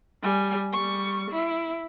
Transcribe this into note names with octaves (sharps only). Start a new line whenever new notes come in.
G3 G#5
G3 C#6
E4